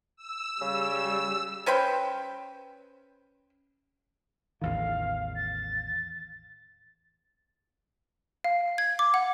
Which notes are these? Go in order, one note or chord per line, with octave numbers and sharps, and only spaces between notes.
E6
C#3 G3
C#4 B4 C5 G5
A1 E2 D#3 F5
A6
F5
G#6
D6
F#5